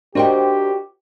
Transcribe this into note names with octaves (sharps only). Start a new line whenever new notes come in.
D4 F#4 G4 A#4 C5 D#5 G5